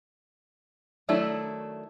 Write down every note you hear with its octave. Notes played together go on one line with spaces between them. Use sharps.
D#3 F#3 A3 D4 E4